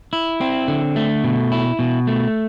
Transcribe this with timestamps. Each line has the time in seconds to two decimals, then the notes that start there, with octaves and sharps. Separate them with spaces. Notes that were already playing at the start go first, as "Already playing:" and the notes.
0.13 E4
0.41 C4
0.68 D3
0.96 A3
1.24 B2
1.52 E4
1.79 B2
2.07 A3